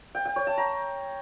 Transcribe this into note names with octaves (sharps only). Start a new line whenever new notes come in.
G5
G5
C#5
A5
A#5